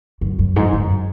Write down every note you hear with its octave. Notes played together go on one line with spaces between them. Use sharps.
F#2
F#2
G#2
F#2